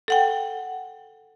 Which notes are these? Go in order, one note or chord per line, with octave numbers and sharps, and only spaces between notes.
A4 F#5 G5